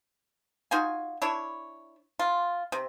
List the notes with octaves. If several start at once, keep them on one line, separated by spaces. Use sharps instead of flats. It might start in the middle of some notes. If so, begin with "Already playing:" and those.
D#4 F4 F#4 G#5
D4 E4 C#5
F4
C3